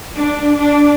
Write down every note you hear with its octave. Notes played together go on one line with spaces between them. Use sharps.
D4
D4